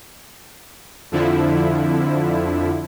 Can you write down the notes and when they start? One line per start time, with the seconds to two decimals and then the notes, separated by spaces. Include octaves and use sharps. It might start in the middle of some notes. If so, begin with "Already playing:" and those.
1.12 F2 D3 F3 E4